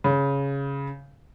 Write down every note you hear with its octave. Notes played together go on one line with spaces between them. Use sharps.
C#3